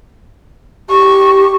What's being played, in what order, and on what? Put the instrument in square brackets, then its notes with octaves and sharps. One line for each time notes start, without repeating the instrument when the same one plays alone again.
[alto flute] G4 [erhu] C#6